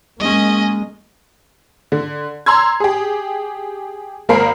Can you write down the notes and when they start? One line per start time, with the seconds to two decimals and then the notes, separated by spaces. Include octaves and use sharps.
0.20 G#3 A#3 C#4 D#5
1.92 D3
2.46 A#5 C6 E6 G#6
2.80 G4 G#4
4.29 G#1 A#3 A#4 C5 B5 C7